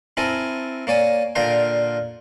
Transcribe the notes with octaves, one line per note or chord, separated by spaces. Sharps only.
C4 E4 A4 A#4 G#5
A#3 C#5 D5 G#5
A#2 D3 A#4 F5 G5 C6